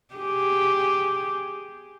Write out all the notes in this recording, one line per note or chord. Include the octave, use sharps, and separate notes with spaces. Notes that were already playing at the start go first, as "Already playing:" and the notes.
G4 G#4